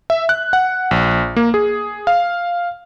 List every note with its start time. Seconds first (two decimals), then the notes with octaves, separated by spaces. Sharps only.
0.10 E5
0.29 F#6
0.53 F#5
0.91 A#1
1.36 A#3
1.54 G#4
2.07 F5